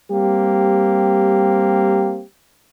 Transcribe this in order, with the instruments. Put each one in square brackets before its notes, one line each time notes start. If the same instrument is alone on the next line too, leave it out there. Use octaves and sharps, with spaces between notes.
[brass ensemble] G3 A#3 C4 G4